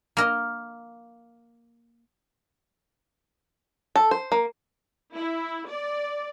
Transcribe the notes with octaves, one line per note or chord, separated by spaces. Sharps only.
A#3 A#4 D#5
A4
C5
A#3
E4
D5